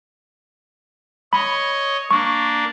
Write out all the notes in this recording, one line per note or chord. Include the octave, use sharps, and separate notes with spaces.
C#5 D#5 B5
A#3 D4 C#6